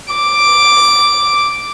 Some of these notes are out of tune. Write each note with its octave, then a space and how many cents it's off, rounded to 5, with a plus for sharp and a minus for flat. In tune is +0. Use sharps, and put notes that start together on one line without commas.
D6 +0